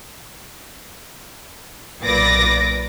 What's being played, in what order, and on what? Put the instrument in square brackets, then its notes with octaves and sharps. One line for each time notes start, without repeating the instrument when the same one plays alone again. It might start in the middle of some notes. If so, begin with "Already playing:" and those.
[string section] B1 A#2 B4 D6 A6 A#6